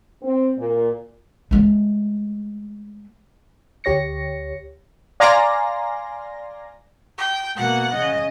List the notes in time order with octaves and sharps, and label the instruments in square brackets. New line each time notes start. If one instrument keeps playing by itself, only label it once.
[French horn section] C4
A#2
[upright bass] G#3 A3
[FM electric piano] D2 G4 C#5 A#6 C#7
[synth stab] D5 F5 G#5 A#5 C6 A#6
[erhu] G5
[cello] B2 A#3 [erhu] F#5
[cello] C#3 D#5